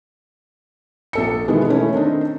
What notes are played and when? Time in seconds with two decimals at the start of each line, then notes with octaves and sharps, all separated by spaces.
1.13 A#1 A4 C#7
1.48 B2 D#3 E3 G#3 B3
1.68 A3 C#4 E4
1.93 D#3 C4 D4 D#4